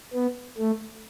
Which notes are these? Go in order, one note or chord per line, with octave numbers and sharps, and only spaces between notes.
B3
A3